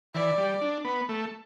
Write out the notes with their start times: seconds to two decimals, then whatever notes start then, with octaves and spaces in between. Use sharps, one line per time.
0.15 E3 D5
0.37 G3
0.61 D4
0.85 B3
1.09 A3